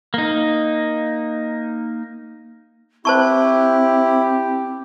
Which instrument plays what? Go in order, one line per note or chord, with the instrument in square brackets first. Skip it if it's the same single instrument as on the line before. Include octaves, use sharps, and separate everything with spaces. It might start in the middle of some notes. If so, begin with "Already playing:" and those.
[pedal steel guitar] A#3 D#4
[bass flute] C4 [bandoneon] E4 [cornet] G4 [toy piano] C5 A5 C#6